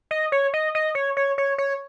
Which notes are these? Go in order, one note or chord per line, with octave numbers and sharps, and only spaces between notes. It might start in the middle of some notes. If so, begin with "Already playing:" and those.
D#5
C#5
D#5
D#5
C#5
C#5
C#5
C#5